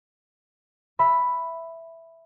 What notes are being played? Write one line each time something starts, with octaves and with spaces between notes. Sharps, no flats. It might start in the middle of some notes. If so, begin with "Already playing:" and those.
E5 B5